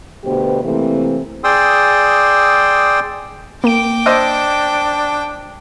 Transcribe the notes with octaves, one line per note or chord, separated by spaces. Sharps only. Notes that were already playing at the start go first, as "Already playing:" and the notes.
D2 B2 B3 G4 C5
C3 E3 A3 A#3 C4
G#4 D5 G5 C6 D#6 E6
A#3 G5 D6 D7
D4 C5 D#5 E6